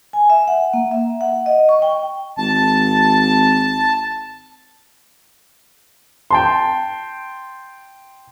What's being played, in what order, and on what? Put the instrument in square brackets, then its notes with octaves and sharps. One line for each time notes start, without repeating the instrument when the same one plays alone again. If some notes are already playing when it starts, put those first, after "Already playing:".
[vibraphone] G#5
E5
F#5
A#3
E5
F#5
D#5
C#6
G5
[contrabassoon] G#1 [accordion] A5
[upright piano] G5 A5 C6